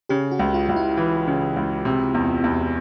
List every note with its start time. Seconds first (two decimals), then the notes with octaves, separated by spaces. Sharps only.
0.09 C#3 G4
0.31 F#4
0.39 C#2
0.54 F4
0.69 C#2
0.76 E4
0.97 E3
1.27 C#3
1.57 C#2
1.85 C3
2.14 E2
2.44 E2